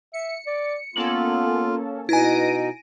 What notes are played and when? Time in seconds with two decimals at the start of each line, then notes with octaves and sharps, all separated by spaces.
0.13 E5 C#7
0.47 D5
0.96 A#3 B3 C#4 F4 A4 F#7
2.09 B2 D#4 E4 B4 G#5 A#6 D7 D#7